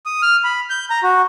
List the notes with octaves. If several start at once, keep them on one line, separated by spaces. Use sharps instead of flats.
D#6
F6
B5
G6
A#5
F#4